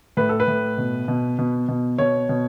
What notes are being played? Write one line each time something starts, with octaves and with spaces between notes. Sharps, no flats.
A2 B4
A4
B4
A2
B2
B2
B2
B2
B2 C#5
B2